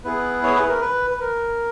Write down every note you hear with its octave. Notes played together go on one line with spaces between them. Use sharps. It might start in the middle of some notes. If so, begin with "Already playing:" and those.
B3 E4 G#4 B4
C#5
B4
A#4
B4
B4
A#4